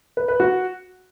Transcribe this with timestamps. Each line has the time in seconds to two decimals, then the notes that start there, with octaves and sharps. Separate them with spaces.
0.17 B4
0.28 B4
0.40 F#4